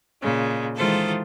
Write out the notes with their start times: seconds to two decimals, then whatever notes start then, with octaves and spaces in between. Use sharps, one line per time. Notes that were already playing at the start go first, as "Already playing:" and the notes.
0.22 A#2 C#3 G#3
0.75 D#3 E3 G#3 F4 A4 C5